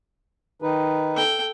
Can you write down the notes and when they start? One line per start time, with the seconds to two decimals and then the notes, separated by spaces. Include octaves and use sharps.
0.62 D#3 D#4 B4
1.15 A4 G5